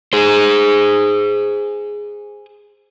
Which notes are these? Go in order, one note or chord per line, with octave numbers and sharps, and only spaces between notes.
G#4 C5